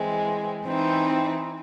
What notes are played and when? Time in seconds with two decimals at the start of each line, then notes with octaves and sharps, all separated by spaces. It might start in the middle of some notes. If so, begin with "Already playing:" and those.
Already playing: E3 G#3 C4
0.65 E3 C4 D#4